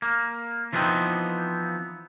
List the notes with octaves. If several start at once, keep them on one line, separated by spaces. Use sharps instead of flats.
A#3
E3 F3 A3 B3 C4 D#4